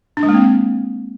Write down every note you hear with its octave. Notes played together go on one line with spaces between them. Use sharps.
D4
G#3
A#3
C4